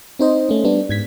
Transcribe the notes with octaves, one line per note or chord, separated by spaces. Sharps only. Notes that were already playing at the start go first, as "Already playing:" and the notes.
C4 D#4 C5 D#5
A3 C#4
G3 B3 D4
G#2 G#6 B6